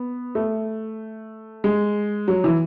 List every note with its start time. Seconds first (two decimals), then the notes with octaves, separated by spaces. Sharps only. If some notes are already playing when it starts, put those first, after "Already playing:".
Already playing: B3
0.35 A3
1.64 G#3
2.28 F#3
2.44 E3